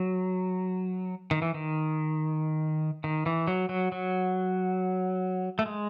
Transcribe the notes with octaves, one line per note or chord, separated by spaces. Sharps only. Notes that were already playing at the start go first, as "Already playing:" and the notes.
Already playing: F#3
D#3
E3
D#3
D#3
E3
F#3
F#3
F#3
A3
G#3